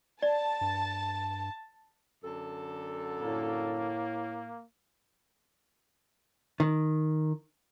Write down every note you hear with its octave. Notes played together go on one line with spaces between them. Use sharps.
D5 A5
G2
F#2 D3 A4
A2 A#3
D#3